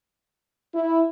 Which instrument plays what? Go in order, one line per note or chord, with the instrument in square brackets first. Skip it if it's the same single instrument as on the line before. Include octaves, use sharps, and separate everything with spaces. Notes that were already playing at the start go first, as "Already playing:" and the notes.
[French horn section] E4